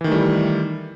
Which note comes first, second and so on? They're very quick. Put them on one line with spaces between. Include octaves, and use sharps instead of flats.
E3 D#3 A3 G3 E4